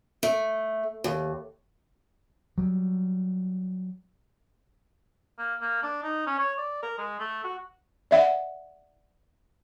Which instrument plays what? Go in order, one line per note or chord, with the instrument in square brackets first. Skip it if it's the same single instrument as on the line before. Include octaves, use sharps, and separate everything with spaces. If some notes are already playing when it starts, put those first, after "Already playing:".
[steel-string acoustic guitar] A3
D#2
[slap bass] F#3 G3
[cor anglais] A#3
A#3
D4
D#4
C#4
C#5
D5
A#4
G#3
A3
F#4
[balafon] D5 E5 F#5